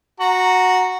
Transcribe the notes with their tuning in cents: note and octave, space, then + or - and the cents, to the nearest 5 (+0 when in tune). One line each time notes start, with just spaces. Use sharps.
F#4 -5 A#5 +0